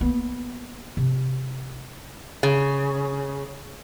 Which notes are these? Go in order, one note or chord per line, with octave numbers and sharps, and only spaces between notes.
A#3 B3
C3
C#3